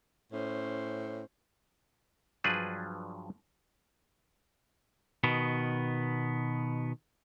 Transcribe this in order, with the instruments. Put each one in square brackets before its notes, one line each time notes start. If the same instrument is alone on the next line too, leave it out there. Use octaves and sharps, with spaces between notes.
[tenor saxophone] A2 [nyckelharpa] C#4 C5
[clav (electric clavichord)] G2 F3 F#3 D4 G#4 B4
[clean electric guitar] B2 D#3 B3